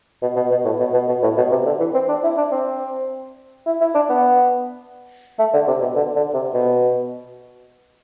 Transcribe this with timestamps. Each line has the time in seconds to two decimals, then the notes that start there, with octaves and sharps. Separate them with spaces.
0.22 B2
0.36 B2
0.51 B2
0.65 A2
0.80 B2
0.94 B2
1.08 B2
1.23 A2
1.37 B2
1.51 C3
1.66 D3
1.80 E3
1.94 C4
2.09 D4
2.23 E4
2.37 D4
2.52 C4
3.66 E4
3.81 E4
3.95 D4
4.09 B3
5.39 A3
5.53 D3
5.67 C3
5.81 B2
5.96 D3
6.16 D3
6.34 C3
6.54 B2